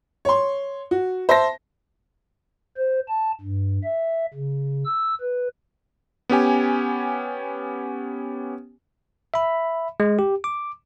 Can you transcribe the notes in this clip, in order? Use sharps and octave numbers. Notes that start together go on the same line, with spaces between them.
C#5 C6
F#4
C5 E5 A5 A#6
C5
A5
G2
E5
C#3
E6
B4
B3 C#4 G4 G#5
E5 B5
G#3
G4
D6